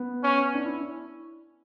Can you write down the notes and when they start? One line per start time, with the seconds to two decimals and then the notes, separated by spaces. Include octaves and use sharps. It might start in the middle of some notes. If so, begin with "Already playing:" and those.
Already playing: B3
0.23 C#4
0.54 D4
0.65 E4